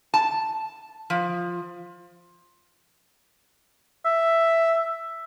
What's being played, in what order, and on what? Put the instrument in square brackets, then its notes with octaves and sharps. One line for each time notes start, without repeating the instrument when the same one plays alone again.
[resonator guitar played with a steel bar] A5
F3
[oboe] E5